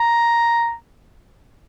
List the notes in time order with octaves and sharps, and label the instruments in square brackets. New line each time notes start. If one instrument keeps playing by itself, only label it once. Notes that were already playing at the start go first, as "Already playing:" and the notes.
Already playing: [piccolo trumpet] A#5